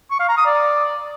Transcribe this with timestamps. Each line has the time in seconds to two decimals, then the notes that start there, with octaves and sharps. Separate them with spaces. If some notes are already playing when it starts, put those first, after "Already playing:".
0.11 C#6
0.20 F5
0.29 A#5
0.37 D#6
0.46 D5